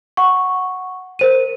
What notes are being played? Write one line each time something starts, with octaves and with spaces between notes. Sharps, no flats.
F#5 C#6
A#4 C5 D#7